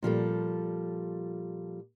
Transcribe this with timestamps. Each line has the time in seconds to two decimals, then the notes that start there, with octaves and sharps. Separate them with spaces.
0.03 A#2 F3 G3 A4